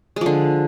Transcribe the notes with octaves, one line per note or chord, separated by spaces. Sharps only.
D3 F3 G#3